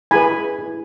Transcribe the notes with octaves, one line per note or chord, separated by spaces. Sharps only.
E4 G#4 B4 G#5 B5
E4 G#4 B4